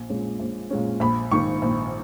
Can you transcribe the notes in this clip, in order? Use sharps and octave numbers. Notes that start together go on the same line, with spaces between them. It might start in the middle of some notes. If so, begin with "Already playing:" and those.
Already playing: A#1
A#2 G#3 C#4
A#1
A#2 G#3 C#4
A#1 B5
G#2 D#3 A#3 D#4 C#6
A#1